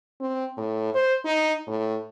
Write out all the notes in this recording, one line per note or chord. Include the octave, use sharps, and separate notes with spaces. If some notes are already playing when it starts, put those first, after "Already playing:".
C4
A2
C5
D#4
A2